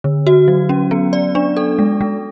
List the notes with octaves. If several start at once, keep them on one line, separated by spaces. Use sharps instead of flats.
D3
F#4
F#3
C#4
B3
D5
D4
A4
G#3
G#3